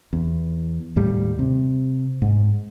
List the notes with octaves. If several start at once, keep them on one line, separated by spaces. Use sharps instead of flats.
E2
D#2 A2 G3
C3
G#2